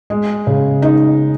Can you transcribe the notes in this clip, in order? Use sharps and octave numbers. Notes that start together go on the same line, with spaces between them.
G#3
C#3
D#4